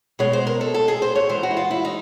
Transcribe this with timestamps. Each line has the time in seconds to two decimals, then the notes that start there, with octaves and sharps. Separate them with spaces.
0.19 B2 G#3 C#5
0.33 C5
0.47 A#4
0.61 A4
0.74 A4
0.88 G#4
1.02 C5
1.16 C#5
1.29 G#2 E3 G#3 C5
1.43 F#4
1.51 E4
1.57 F4
1.71 E4
1.85 D#4